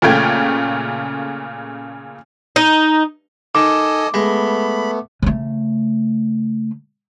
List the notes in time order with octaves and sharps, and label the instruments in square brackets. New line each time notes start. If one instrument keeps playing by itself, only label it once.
[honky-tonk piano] A#2 C#3 A3 G5 G#6
[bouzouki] D#4
[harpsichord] D#3 [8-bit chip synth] A4 D#5 G#5 [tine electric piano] D6
[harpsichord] G#3 [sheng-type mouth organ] A3 B3 [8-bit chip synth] B5
[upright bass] C#3 A3